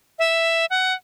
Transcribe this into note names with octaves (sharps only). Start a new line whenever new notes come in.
E5
F#5